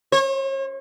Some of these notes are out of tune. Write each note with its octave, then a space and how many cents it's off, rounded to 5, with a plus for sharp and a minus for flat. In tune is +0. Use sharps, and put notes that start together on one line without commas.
C#5 -40